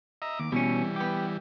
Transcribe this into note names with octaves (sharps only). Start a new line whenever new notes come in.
D#5 E5 A#5
D#2 D6
B2 E3 G3 C#4
B3 G4